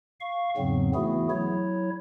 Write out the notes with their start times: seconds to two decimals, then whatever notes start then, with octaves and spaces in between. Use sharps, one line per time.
0.20 F5 C#6
0.57 E2 G#2 C#3 F#3 B3 C4
0.95 E3 A3 B3 E4 F#4 G#4
1.31 F#3 E4 C#5